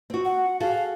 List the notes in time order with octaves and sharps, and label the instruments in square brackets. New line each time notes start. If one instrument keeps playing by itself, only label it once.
[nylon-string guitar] C4 F#4
[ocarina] F#5
[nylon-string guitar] F#4 G#4 A4 [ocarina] F5